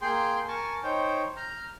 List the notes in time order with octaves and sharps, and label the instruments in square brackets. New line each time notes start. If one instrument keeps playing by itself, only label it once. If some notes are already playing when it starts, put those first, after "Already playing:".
[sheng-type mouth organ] A#3 G#4 G5 C6
A#4 G#5 A5 C#6
D#4 C5 C#5 G5
A#5 F6 G6